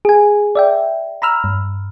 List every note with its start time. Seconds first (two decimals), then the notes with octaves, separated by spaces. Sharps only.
0.05 G#4 G#5
0.55 D5 E5 G5
1.22 A#5 B5 E6 F6
1.44 G2